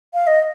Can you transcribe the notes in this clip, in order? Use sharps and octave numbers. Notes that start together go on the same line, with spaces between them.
F5
D#5